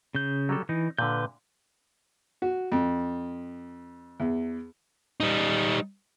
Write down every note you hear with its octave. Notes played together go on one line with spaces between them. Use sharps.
C#3 G6
F#3 G3 A4
E3 D#4
A#2 D3 B4 G6
F#4
F2
E2
G3 D#4